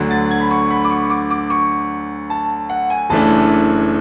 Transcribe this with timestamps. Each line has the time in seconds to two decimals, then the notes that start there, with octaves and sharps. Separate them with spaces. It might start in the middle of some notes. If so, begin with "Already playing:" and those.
Already playing: D2 D3 F#3
0.11 A6
0.31 G#6
0.40 B5
0.51 C#6
0.70 B5
0.84 D6
0.90 C#6
1.10 D6
1.31 D6
1.50 C#6
2.30 A5
2.70 F#5
2.90 G#5
3.10 F#1 F#2 E3 A3 D4 A5